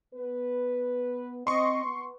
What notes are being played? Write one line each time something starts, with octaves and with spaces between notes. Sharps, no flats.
B3 B4
C4 D#5 C6 C#6
B3